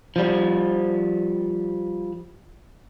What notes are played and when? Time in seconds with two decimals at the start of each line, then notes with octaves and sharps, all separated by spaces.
0.16 F3 G3